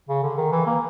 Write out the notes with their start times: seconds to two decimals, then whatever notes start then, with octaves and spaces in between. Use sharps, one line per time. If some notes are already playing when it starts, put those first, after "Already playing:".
0.09 C#3
0.23 D3
0.38 D#3
0.52 E3
0.66 A#3